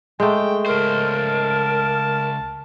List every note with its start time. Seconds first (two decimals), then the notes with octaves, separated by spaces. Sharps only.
0.20 G#3 A3 G5
0.66 C#2 A#4 C5 A5